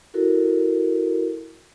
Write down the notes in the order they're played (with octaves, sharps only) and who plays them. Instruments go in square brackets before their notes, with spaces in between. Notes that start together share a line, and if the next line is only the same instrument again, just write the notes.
[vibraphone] E4 F#4 A4 A#4